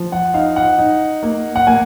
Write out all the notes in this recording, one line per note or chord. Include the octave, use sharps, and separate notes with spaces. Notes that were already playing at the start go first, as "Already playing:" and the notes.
Already playing: F3
F#5
D#4 F5
F#5
D#4
A#3
F#5
A#3 G#5